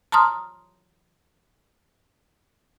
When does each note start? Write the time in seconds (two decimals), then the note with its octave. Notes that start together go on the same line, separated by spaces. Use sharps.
0.12 A5 A#5 C6 D#6 F6